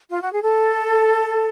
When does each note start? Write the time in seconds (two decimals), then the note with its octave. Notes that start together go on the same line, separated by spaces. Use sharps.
0.10 F4
0.21 F#4
0.31 G#4
0.42 A4